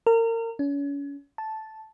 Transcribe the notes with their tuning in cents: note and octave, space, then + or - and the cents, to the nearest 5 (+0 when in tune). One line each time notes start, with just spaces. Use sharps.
A#4 -30
C#4 +35
A5 -5